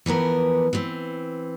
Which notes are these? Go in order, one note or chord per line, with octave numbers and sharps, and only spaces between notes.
E3 F3 B3 A#4
E3 C4